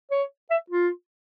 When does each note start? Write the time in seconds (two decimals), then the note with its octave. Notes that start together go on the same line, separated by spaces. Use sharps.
0.11 C#5
0.50 E5
0.70 F4